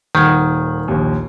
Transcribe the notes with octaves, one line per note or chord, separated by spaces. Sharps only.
D#1 D#3 F#5 G#6
A#1 D#2